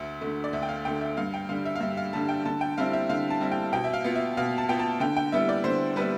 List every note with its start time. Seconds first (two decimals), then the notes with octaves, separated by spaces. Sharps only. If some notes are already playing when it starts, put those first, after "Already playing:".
Already playing: D2 E5
0.21 D3 A3
0.44 D5
0.53 D2 E5
0.63 G5
0.69 F5
0.85 D3 A3 G5
1.01 E5
1.17 G2 F5
1.34 G5
1.49 D3 G3 F5
1.65 E5
1.75 F5
1.81 G2 E5
1.97 F5
2.13 D3 G3 A5
2.29 G5
2.45 D3 A5
2.61 G5
2.77 G3 C4 E4 F5
2.93 E5
3.09 D3 F5
3.30 A5
3.40 G3 C4 E4
3.52 G5
3.73 B2 G5
3.84 E5
3.93 F5
4.04 B3 F4
4.16 E5
4.37 B2 F5
4.58 A5
4.69 B3 F4 G5
4.79 A5
5.00 D3 G5
5.17 G5
5.32 G3 B3 E4 E5
5.49 D5
5.64 D3 C5
5.96 G3 B3 E4 B4